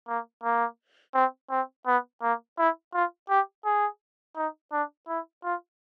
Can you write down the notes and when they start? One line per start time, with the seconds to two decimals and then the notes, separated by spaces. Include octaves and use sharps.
0.08 A#3
0.44 A#3
1.14 C4
1.51 C4
1.86 B3
2.22 A#3
2.58 E4
2.94 F4
3.29 G4
3.65 G#4
4.36 D#4
4.72 D4
5.08 E4
5.44 F4